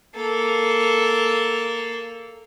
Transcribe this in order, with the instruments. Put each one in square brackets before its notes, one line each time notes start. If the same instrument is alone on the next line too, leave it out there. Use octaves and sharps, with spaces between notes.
[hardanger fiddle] A#3 A4